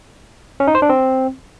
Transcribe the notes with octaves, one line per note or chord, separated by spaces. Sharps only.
C#4
D#4
C5
D4
C4